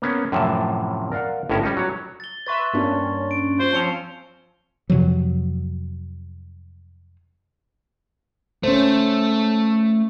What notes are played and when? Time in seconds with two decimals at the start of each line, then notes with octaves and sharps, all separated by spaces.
0.02 A#3 B3 C#4
0.32 F#2 A2 C3 E3 F3 A5
1.12 A#4 D5 F5 F#5
1.49 G1 A2 C#4 A#4 E5
1.63 G3 C#4 D#4
1.77 F#3 C#5
2.20 A6 G7
2.47 B4 E5 C6 C#6 A6
2.73 G2 A#3 C#4 D4
3.31 D7
3.59 F4 C5
3.73 F3 C4 C#4 A5 C#7 F7
4.90 F2 C3 F3 F#3
8.63 A3 C#4 C5